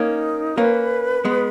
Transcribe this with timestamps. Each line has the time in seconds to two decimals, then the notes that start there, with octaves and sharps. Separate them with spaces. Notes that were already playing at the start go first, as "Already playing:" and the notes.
Already playing: A#3 C#4 D#4
0.57 A#3 C#4 B4
1.25 G#3 B3